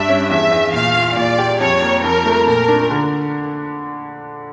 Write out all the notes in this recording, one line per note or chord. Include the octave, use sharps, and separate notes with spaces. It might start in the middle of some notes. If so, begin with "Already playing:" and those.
Already playing: G2 D4 E5
C#4
E2 E5
E2
A#2 F5
F4
A#2 D5
G4
F2 C#5
A#3
F2 A#4
A3
A#2 A#4
D4
D3